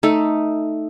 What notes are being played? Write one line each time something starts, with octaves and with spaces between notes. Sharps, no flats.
A3 D#4 A4